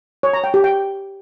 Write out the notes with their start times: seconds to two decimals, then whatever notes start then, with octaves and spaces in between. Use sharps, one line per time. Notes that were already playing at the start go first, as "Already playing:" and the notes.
0.23 C#5
0.34 A#5
0.44 G5
0.54 G4
0.64 G5